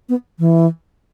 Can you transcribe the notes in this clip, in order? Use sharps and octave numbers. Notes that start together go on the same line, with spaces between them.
B3
E3